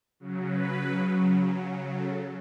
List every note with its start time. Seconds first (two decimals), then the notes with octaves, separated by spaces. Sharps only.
0.20 C#3 F#3
0.48 B4
1.96 A4